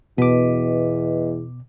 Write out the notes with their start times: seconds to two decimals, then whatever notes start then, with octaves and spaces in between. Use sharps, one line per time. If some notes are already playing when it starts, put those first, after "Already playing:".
0.18 E2 B2 B4 D#5 D6